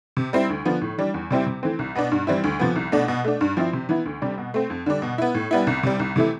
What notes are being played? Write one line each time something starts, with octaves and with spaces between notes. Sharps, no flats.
C3
G3 C4 E4
D2
D3 F3 B3
A2
E3 G3 D4
E2
C3 G3 C4 E4
C3
E3 A3 C4
C2
B2 B3 D4
G2
E3 G3 C4 E4
D2
C3 F3 B3
C2
B2 A3 D4
B2
A3 D4
G2
F3 C4 E4
C3
E3 B3 E4
D2
C3 G3 D4
B2
A3 C4
F2
D3 G3 D4
B2
B3 E4
A2
G3 B3 E4
C2
C3 G3
C2
C3 E3 A3 E4